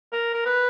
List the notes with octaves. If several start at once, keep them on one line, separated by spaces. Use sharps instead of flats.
A#4
A#4
B4